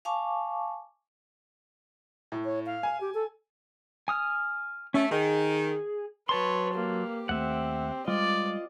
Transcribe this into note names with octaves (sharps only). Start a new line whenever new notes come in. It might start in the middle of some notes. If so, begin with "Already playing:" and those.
F5 G#5 A5 C#6 D6
A2
C#5
F5
G#5
G4
A4
G#5 D#6 F6
A3 C#4
D#3 G#4
F#3 B4 C#5 A5 C6
A#3 G4
D#2 A3 C4 E5 F#5
G3 G#3 F4 D5 D#5